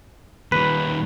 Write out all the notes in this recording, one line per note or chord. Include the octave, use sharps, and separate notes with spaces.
D#2 G3 B4